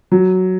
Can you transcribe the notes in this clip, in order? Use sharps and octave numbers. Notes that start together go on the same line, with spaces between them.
F#3